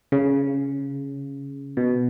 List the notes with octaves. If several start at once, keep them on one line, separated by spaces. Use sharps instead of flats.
C#3
B2